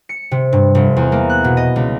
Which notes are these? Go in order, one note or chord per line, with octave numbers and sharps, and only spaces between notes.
C#7
C3
G2
F1
E2
A#3
F#6
B2
D#5
C#2